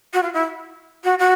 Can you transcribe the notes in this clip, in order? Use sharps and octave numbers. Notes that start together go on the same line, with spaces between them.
F#4
F4
E4
F#4
F#4